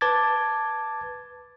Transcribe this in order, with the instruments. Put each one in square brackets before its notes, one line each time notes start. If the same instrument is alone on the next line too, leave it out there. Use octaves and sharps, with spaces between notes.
[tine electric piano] B4 A5 D6 G#6 A6